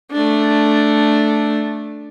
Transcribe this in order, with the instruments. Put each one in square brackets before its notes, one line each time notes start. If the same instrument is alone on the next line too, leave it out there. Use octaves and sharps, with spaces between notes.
[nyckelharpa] A3 D4